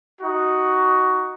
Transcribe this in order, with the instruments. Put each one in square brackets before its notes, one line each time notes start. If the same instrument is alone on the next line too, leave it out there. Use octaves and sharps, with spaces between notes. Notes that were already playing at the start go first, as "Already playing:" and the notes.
[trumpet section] D#4 F#4